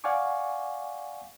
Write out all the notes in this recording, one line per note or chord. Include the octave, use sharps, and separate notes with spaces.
D5 F5 F#5 G#5 C#6 D6